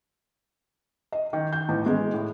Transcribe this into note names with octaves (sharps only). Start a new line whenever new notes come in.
D#5
D#3
G6
A1
G#3
A2